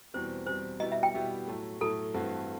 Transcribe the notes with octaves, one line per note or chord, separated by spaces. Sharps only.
E2 B2 G3 C4 C5
E2 B2 G3 C4 C5
B2 G3 B3 E4 G4 D#5
E5
G5
B2 G3 B3 E4 G4
A2 F#3 A3
A2 F#3 A3 A4
G2 E3 A3 C4 F#4